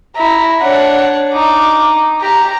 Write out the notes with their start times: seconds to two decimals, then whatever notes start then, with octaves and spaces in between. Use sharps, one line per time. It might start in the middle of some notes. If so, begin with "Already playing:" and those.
0.16 E4 A#5
0.61 D4 C#5 F#5
1.33 D#4 D6
2.21 G4 A#5